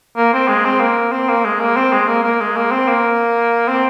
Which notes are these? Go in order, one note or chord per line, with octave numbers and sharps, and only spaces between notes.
A#3
C4
G#3
C4
A#3
C4
A#3
G#3
A#3
C4
G#3
A#3
A#3
G#3
A#3
C4
A#3
C4